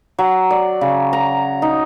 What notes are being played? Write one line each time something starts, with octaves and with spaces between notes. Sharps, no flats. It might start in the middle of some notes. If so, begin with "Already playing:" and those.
F#3
D5
C#3
A#5
D#4